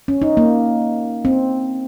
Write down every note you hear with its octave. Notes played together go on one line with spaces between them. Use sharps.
C#4
D#4
A#3
C4